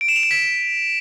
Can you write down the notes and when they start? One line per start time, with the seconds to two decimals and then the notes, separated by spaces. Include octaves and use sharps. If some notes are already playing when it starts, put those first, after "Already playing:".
0.01 D7
0.08 E7
0.16 F7
0.23 E7
0.31 B6